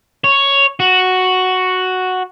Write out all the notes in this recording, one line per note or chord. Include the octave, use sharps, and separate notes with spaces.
C#5
F#4